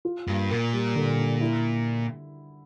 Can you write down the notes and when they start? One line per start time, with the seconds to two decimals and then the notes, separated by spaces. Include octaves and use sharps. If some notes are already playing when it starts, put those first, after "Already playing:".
0.05 F4
0.27 G2 A#3
0.50 A#2 A#4
0.73 G3
0.96 D3
1.18 D4
1.41 E4